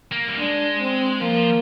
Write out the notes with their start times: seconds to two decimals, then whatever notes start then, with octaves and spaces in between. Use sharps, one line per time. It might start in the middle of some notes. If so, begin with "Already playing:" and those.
0.12 A#3
0.28 G3
0.38 G#3 D4
0.80 C4
1.21 F3 A#3